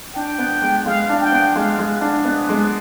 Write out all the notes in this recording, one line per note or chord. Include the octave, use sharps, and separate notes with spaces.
D4 G5
B3
G#3
G#3 F5
D4
G5
B3
G#3 F5
G#3
D4
B3 D#5
G#3